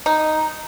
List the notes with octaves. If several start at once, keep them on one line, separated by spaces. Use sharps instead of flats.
D#4